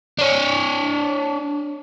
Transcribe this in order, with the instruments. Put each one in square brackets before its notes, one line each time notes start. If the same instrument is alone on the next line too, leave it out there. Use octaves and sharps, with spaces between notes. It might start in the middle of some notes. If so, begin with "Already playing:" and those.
[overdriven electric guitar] D4 C#5